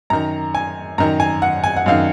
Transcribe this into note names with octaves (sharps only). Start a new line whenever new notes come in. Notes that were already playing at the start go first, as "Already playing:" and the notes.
F#2 D#3 A#5
G#5
F#2 D#3 A#5
G#5
F#5
G#5
F#5
F#2 D#3 F5